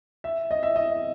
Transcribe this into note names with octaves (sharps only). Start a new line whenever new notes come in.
E5
D#5
E5
D#5